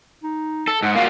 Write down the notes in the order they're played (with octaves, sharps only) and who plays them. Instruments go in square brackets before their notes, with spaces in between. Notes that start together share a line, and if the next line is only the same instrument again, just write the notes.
[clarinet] D#4
[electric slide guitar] A4
[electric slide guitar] G#2 [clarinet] F#5
[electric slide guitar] A#3 F4 F#4 [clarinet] F5